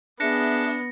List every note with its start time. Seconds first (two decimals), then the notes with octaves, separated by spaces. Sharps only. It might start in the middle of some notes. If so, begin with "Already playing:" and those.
0.20 B3 D4 G#4 E5 A#6 C#7